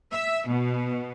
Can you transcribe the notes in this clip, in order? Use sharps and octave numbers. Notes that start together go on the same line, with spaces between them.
E5
B2